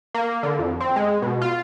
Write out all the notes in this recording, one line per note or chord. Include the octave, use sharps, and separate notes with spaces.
A#3
D3
F2
C4
G#3
B2
F4